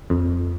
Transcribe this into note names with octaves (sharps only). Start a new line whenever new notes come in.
F2